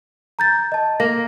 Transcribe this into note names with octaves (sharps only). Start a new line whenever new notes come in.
A#5 G6 A6
D#5 A5
A#3 A#6